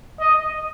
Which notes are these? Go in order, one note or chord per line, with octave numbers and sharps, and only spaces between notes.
D#5